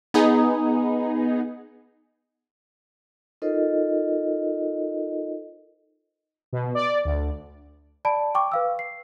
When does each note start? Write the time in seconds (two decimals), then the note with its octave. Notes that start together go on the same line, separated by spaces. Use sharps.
0.14 B3 D#4 G#4
3.42 D#4 F4 A4 A#4 C5 D#5
6.53 B2
6.75 D5
7.05 D2
8.05 D5 A5 B5 D7
8.35 G5 C#6 D6
8.52 B4 F5 E6
8.79 C7